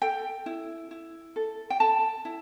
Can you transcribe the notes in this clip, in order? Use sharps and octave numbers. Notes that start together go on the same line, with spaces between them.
A4 G5
E4
E4
A4
G5
A4 A5
E4